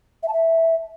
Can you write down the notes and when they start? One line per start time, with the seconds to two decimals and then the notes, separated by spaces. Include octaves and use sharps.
0.23 E5
0.28 A5
0.33 E5